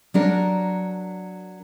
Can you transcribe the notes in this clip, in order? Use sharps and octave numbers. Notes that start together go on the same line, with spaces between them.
F#3 D4 A#4